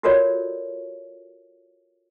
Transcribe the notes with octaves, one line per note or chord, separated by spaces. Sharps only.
F4 F#4 A4 A#4 C#5 D5